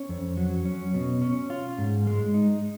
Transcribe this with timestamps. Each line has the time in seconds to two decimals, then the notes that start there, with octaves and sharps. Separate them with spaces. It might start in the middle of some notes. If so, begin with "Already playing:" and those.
Already playing: C#4
0.09 F2
0.37 F#3
0.65 C#4
0.94 B2
1.22 C#4
1.50 F4
1.78 G#2
2.07 G#3
2.34 D#4